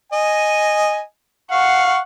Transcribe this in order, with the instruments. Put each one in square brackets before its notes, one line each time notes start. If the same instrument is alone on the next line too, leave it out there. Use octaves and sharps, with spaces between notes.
[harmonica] D#5 G#5
[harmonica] F5 C#6 [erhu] F#5